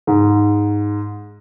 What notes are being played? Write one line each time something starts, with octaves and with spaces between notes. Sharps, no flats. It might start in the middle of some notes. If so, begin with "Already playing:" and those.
G#2